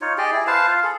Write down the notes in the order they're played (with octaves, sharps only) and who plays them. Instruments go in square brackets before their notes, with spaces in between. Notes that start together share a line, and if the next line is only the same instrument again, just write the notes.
[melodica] D#4 F4 C#5
G4 G#4 D5 D#5
E4 G#4
B4 C5 F5 A5
F4 F5
G#4 A4